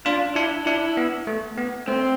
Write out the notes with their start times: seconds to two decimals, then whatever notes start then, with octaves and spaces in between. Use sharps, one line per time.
0.06 D4 F4
0.35 D4 E4
0.66 D4 E4
0.97 B3
1.27 A3
1.57 B3
1.88 A3 C4